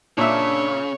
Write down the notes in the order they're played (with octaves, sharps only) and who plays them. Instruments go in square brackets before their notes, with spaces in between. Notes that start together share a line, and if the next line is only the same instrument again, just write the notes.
[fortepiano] A#2 E5 [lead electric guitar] C#3 [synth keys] D4 [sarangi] C#5